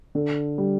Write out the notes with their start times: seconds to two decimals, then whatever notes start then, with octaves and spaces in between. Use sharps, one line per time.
0.15 D3
0.58 G3